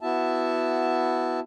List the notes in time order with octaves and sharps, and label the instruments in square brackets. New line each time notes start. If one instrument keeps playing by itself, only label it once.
[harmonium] B3 E4 F#4 E5 A5